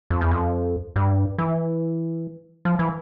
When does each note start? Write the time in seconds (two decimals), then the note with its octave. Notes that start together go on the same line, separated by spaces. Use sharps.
0.10 F2
0.21 E2
0.31 F2
0.96 G2
1.38 E3
2.65 F3
2.79 E3